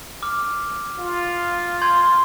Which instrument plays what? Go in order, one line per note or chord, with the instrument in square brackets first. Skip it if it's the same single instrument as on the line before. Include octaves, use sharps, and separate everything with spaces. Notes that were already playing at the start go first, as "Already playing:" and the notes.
[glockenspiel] D6 F6
[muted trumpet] F4
[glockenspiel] C6 G6 G#6